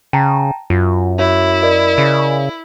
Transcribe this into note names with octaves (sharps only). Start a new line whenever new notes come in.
C#3 G5 A5 A#5
F#2 F4
E4 F#4 C#5 E5
A#4 D5 D#5
C#3